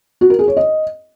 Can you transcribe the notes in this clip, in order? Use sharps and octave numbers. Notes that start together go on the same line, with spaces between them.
F#4
A#4
G#4
C#5
D#5